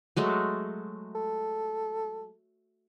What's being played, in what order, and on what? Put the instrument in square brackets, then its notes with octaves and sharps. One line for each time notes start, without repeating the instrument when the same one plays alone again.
[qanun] F#3 G#3 A3
[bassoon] A4